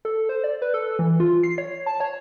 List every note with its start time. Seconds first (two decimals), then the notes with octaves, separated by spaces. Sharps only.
0.05 A4
0.29 C5
0.44 D5
0.62 B4
0.74 A4
0.99 E3
1.20 F4
1.43 C7
1.58 C#5
1.86 A5
2.00 C#5